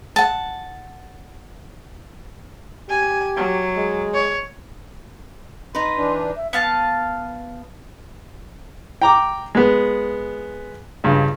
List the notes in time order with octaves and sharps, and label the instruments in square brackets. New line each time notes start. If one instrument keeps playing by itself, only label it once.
[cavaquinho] F#5 A5
[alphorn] G4 [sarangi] G#5
[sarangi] F#3
[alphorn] G#3
[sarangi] C#5
[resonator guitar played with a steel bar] D#4 B4 [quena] C6
[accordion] E3 D4
[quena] E5
[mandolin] B3 F5 A5
[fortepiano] G5 A#5 D6
G#3 B3
C#2 G2